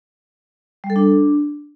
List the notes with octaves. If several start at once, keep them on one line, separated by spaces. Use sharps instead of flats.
G3
A4
D4